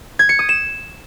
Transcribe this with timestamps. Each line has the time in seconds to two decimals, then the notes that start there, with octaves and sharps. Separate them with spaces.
0.19 G#6
0.29 C#7
0.39 D#6
0.49 E7